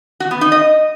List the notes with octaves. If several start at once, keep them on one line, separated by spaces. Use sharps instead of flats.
F#4
B3
D#4
D#5